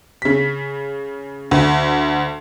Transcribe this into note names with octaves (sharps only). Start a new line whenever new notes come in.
C#3 B6
D2